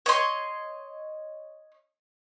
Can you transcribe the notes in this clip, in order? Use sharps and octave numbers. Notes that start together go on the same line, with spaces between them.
C#5 D#5 C6